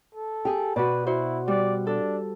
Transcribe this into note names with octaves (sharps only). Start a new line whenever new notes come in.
A4
G4 G#4
B2 F#4 B4 D5
E4 F#4 C5
G3 D5 F#6
D4 A4